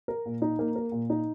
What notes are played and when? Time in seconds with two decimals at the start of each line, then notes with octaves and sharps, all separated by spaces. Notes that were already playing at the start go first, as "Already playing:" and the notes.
0.08 A#4
0.26 A#2
0.42 D#4
0.59 A#3
0.76 A#4
0.92 A#2
1.10 D#4